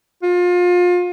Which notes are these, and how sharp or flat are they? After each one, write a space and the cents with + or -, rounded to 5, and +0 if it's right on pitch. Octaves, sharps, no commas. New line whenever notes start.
F4 +30